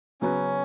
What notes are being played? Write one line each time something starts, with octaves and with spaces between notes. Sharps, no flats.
C#3 F#3 B3 C#4 F#4 B4